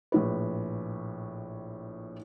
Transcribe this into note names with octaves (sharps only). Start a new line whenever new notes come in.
A#1 A2 B4